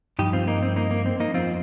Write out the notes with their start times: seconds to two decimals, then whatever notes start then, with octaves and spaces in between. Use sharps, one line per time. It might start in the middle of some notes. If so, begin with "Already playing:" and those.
0.19 G2 F3 D#4 G4
0.33 C4 F4
0.47 A#3 D#4
0.63 C4
0.76 A#3 D#4
0.91 A#3
1.06 C4
1.20 A#3 D#4
1.34 F2 F3 C4 F4